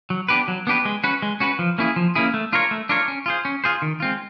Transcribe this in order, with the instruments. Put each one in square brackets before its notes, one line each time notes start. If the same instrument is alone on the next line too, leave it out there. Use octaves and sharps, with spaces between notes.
[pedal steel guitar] F#3
B3 D4 G4 B4
F#3
B3 D4 G4 B4
G#3
C#4 F#4 B4
G#3
C#4 F#4 B4
F3
A#3 C#4 E4 G#4
F3
A#3 C#4 E4 G#4
A3
D4 F4 A#4 C#5
A3
D4 F4 A#4 C#5
C#4
F4 G#4 C5
C#4
F4 G#4 C5
D#3
G#3 C4 F4